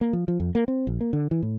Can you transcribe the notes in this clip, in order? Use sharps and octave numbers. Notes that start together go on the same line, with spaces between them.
A#3
F3
F3
F2
A#3
C4
A#1
A#3
D3
E3
A2